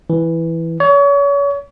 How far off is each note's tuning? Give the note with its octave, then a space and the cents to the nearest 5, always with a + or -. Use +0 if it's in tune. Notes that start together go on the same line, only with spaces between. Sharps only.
E3 +0
C#5 +35